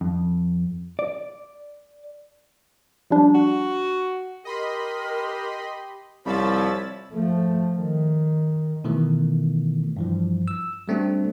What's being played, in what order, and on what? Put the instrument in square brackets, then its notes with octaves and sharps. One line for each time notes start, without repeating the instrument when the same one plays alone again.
[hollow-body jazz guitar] F2
D5
[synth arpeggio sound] F3 G3 D4
[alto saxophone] F#4
[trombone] G4 [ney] A#4 [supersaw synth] D#5 B5 C6
[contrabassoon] C2 [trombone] F3 [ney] C#5 [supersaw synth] B5 E6 A6
[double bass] F3 A3
D#3
[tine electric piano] B2 D#3 E3 A3
G2 E3 F3
E6
G3 A3 C4 D4 F#4